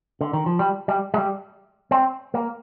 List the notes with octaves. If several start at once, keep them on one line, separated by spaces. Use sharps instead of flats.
D3
D#3
F3
G3
G3
G#3
G3
C4
A#3